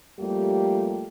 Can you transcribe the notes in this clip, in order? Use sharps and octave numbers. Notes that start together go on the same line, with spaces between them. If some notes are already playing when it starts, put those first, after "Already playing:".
F2 G3 A3 A#3 F4 G4